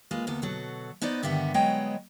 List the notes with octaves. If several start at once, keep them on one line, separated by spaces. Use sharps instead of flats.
G#3 A#3 F4 B4
D2 A#3 B3 A4
B2 F#3 F#4 A4
B3 D#4 B4 C5 D5
G2 D3 D#3 B3 E5 F#5
F#3 G#3 B3 C#5 D#5 G5